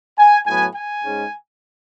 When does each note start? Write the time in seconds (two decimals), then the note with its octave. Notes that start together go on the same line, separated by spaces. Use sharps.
0.18 G#5
0.46 A2 F#3 B3 G#5
0.75 G#5
1.04 G#2 G#3 C#4